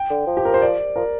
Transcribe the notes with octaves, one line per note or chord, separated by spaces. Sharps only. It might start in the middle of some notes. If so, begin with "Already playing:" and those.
Already playing: G5
D3
F3
G4
A#4
C5
D5
F3 A#4